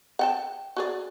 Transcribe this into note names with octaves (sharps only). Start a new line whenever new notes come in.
F#5 G5 A5
F#4 G#4 D5